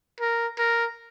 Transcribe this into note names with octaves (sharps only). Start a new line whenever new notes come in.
A#4
A#4